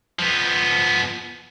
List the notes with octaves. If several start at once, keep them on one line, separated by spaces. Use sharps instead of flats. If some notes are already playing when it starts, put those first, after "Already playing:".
F3 B3